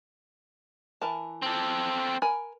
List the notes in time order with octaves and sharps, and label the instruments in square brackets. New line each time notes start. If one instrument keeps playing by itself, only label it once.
[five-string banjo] E3 A#4 A5
[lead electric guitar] C4 A4
[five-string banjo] A#4 G#5 B5